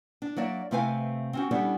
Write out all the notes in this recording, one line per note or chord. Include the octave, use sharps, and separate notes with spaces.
D4
F#3 A#3 D5 E5
C3 A3 C4 B4 F5 G#5
C4 C#4 F#4
G3 B3 C#4 D4 G4 A4